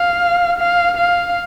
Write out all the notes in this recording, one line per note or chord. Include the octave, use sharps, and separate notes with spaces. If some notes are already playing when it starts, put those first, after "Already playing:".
Already playing: F5
F5
F5